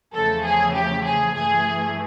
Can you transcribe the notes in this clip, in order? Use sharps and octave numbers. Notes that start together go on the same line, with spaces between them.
E2 C#3 F3 A3 A4
G#4
G4
G#4
G2 E3 A3 G#4